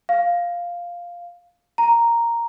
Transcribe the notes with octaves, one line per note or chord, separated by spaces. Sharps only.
F5
A#5